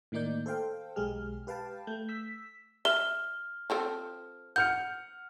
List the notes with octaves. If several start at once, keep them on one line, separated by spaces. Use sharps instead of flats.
A2 D#3 A#3 D#4 D5 G6
A4 C5 F5 G5
B1 G#3 G4 G#4 F6
G4 B4 F5 G5 A5
A3 G6
E6 B6
E5 F6 G7
F3 C4 A4
F#5 F6 G6 C#7